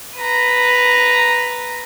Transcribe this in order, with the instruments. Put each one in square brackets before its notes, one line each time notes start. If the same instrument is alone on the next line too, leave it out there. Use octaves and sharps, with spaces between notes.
[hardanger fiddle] B4 A#5